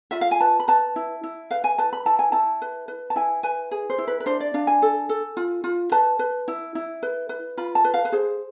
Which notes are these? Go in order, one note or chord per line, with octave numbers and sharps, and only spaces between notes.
F4 E5
F5
G#5
B4 A5
B5
B4 A5
E4
E4
B4 F5
G#5
B4 A5
B5
E4 A5
G#5
E4 A5
B4
B4
A5
E4 G#5
B4 G#5
G#4
C5
E4
B4
B4
D4 C5
D5
D4 F5
G#5
A4
A4
F4
F4
B4 A5
B4
E4
E4
B4
B4
F4 B5
A5
B4
F5
B4
G#4 C5